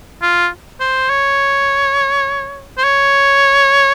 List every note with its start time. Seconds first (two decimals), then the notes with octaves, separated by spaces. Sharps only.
0.22 F4
0.80 C5
1.09 C#5
2.78 C5
2.84 C#5